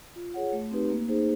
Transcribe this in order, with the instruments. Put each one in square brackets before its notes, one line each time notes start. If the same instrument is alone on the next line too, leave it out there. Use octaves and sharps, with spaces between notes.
[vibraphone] F4
G#4 C#5 F#5
A3
C4 D#4 G4 B4
A#3
D#4 G#4 C5